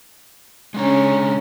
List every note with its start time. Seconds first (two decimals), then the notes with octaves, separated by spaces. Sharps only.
0.74 C#3 G#3 C#4 D4 A#5